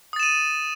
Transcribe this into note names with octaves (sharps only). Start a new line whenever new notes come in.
D#6 A6 D#7 E7